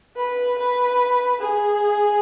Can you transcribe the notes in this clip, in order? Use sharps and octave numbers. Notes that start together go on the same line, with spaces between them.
B4
B4
G#4